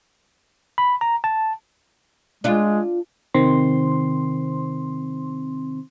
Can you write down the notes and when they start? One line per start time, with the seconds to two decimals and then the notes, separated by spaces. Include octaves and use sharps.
0.78 B5
1.01 A#5
1.24 A5
2.44 G#3 D4 F4
3.34 C3 D#3 C4 C6